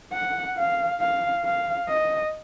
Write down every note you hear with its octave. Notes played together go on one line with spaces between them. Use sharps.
F#5
F5
F5
F5
D#5